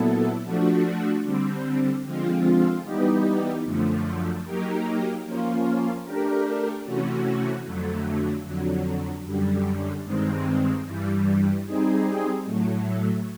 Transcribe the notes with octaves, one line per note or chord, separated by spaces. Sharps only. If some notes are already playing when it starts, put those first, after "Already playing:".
Already playing: A#2 F#3 B3 E4 A4
F3 A3 D4 F#4
D3 G3 C4
D3 F3 G#3 C4 F4
E3 G3 B3 D#4 G4
F#2 D3 F3 A3
F#3 A#3 D#4 G4 A#4
F3 A#3 C#4 F4
A3 D4 G4 A#4
C3 E3 A3 C#4 F#4
F2 D3 F#3 A3
F2 D3 F#3
F#2 D3 G3
G2 D#3 G#3 C4
G2 E3 G3
G3 C4 D#4 G#4
A2 F#3 A3